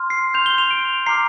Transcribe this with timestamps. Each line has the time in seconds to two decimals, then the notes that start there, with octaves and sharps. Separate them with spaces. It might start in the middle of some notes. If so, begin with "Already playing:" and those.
Already playing: C6 F6
0.10 C7
0.34 C6 G6 F7
0.46 G7
0.58 F7
0.71 D7
1.06 A#5 D6 F6 C7